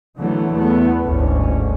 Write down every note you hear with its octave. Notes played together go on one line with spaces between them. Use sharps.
D3 E3 F#3 A3 B3
E2 A3 B3
G1 D2 G#2 C#4